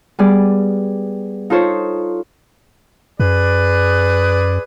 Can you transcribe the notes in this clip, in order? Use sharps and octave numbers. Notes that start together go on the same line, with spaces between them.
G3 B3 G#4 D5
D#4 F4 A4 C5 C#5
F#2 G#4 B4 D5